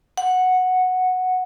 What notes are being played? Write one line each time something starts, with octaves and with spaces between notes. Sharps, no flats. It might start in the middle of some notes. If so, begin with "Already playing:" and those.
F#5